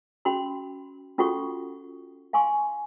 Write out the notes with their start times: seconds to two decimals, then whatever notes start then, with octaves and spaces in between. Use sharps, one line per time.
0.25 C#4 F#4 B5 C6
1.18 C#4 F4 F#4 A4 F#5 C#6
2.33 F5 G#5 C6 C#6